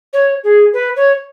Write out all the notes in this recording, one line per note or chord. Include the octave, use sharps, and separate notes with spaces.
C#5
G#4
B4
C#5